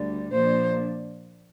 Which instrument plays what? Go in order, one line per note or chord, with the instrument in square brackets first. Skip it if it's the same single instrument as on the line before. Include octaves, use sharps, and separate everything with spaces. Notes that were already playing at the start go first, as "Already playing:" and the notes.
Already playing: [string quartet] D2 D3 G3
A#2 F3 A#3 D4 C5